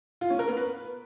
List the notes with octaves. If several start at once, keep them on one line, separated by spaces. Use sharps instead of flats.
F4
C#4
A#4
B3
B4